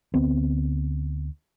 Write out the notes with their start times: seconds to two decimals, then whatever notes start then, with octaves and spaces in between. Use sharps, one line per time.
0.14 D2 B3 C4